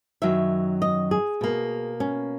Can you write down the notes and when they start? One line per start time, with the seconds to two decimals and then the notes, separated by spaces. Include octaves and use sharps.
0.22 F#2 D#3 F#3 E5
0.82 D#5
1.11 G#4
1.41 B2 A#3
2.00 C#4